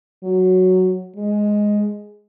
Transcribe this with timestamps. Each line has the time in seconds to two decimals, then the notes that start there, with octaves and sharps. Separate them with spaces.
0.24 F#3
1.17 G#3